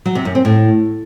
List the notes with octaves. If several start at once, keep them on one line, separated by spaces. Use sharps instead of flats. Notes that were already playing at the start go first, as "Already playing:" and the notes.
F#3
C3
F#2
C4
A2